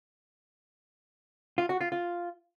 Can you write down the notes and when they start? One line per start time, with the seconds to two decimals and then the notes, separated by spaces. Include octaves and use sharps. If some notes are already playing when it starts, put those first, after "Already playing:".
1.58 F4
1.69 F#4
1.81 F4
1.92 F4